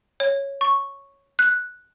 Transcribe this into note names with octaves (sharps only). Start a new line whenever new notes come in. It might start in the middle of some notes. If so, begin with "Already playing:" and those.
C#5
C#6
F#6